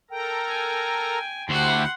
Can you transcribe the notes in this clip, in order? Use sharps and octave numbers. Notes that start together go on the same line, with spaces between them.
A4 A#4 G5 A#5
G#5
D2 E4 F#4 G4 C5 F#5 C6